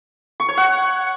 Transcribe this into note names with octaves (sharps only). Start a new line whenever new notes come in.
C#6
C#5
F#5